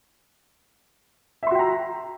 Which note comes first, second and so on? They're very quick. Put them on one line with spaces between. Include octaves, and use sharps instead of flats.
E5 C6 F#4 G5 A#5